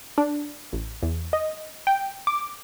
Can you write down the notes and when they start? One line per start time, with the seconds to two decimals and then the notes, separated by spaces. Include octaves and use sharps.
0.18 D4
0.73 A1
1.02 E2
1.33 D#5
1.87 G5
2.27 D6